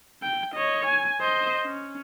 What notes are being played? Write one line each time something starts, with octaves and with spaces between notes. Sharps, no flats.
G5
C#5 D#5
G#5
C5 D#5
C#4